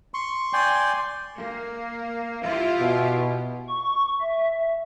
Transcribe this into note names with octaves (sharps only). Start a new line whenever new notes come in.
C6 C#6
D5 G5 G#5 C6
A#3
E4 F4 G4
B2
C#6
E5